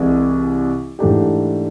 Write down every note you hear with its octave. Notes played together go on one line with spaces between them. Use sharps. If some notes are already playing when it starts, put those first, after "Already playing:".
Already playing: C2 C3 E3 G#3
G#2 E3 A3 D4 G4